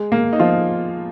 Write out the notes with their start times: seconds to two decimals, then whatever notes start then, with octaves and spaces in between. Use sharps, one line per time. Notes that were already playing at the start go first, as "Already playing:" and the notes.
Already playing: G#3
0.12 A#3
0.33 D#4
0.40 F3 F4